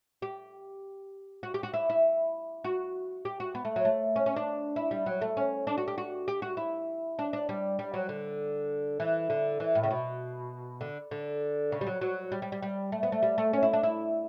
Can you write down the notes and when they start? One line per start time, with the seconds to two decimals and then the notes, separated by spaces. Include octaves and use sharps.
0.22 G4
1.43 F#4
1.54 G4
1.63 F#4
1.74 E4
1.89 E4
2.64 F#4
3.25 G4
3.40 F#4
3.55 B3
3.65 A3
3.76 F#3
3.85 A3
4.16 C#4
4.26 C#4
4.36 D4
4.76 E4
4.91 G3
5.06 F#3
5.21 A3
5.37 C#4
5.67 D4
5.78 F#4
5.88 G4
5.98 F#4
6.28 G4
6.42 F#4
6.57 E4
7.19 D4
7.33 D4
7.49 G3
7.79 G3
7.94 F#3
8.09 D3
9.00 E3
9.30 D3
9.60 E3
9.75 A2
9.83 C#3
9.90 B2
10.81 D3
11.11 D3
11.72 C#3
11.81 G3
11.86 F#3
12.01 F#3
12.32 G3
12.42 G3
12.52 G3
12.62 G3
12.92 A3
13.03 B3
13.12 A3
13.23 G3
13.38 A3
13.53 C#4
13.63 E4
13.73 D4
13.83 E4